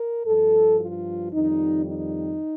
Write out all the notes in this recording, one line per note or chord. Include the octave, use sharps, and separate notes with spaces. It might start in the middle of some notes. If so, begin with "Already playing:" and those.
Already playing: A#4
G2 F3 A4
F4
F2 D#3 G3 D#4
D#4